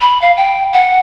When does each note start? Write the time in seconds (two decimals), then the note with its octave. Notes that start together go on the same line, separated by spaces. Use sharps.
0.01 B5
0.22 F5
0.37 G5
0.73 F#5